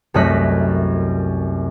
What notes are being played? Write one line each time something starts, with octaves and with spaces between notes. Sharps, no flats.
C2 F#2 A3 D#5 F#6 B6